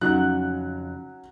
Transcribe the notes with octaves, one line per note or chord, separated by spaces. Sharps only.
F2 C#3 F#3 C#4 D#4 F#6